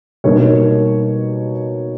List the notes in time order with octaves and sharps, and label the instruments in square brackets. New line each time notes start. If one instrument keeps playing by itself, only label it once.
[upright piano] B2 G3 A#3 D#4 C#5